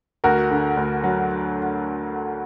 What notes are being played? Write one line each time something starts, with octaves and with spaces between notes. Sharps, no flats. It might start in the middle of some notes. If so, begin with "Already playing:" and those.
D2 F#4 A#4
D3
D2
F#3